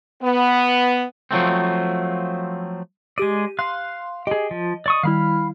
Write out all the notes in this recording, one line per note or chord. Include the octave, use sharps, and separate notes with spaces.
B3
F3 F#3 A3 C4
G#3 G4 D5 D#7
F5 C6 F#6
G4 G#4 D#5
F3
D5 C#6 D#6
D#3 G3 E4 F5 B5 F6